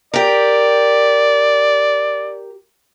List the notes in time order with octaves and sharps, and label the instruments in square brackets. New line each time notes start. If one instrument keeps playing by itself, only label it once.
[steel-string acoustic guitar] G4 A#4 [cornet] D5